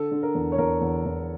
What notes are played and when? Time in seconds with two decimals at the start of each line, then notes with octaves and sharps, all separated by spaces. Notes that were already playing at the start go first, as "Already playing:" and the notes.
Already playing: D3 A4
0.11 D3
0.23 A#4
0.35 E2
0.52 C#5
0.58 E2 A#4
0.81 E2
1.05 E2